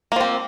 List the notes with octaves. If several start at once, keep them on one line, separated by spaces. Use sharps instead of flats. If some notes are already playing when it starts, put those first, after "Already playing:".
F3 A#3 C4